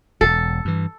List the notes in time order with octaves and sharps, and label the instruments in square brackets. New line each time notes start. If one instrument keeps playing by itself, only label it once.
[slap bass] E1 [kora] A4
[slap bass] G2 E3